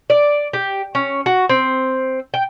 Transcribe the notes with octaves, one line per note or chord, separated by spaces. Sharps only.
D5
G4
C#4
F#4
C4
G5